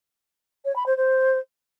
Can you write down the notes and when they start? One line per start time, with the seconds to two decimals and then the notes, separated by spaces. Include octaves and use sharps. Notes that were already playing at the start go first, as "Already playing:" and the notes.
0.65 C#5
0.76 B5
0.86 C5
0.97 C5